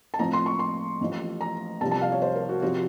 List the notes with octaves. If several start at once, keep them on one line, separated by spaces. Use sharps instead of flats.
A5
A2 F3 C4 A#5
C6
C#6
C6
A1 A2 F3
A#5
C2 C3 F3 A5
A5
F5
C#5
C5
A#4
F#4
C3 F3 C4 F#4